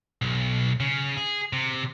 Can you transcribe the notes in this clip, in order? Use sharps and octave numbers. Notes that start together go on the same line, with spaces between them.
B1
C#3
G#4
C3